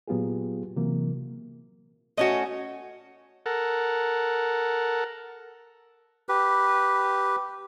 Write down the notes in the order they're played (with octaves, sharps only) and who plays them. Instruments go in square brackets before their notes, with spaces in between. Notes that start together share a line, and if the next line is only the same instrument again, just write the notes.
[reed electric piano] A#2 F#3 B3 F4 G4 G#4
C3 E3 F#3 A#3
[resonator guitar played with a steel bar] A3 C#4 F#4 [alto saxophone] D#5
[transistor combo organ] A4 A#4 F#5
[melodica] G4 B4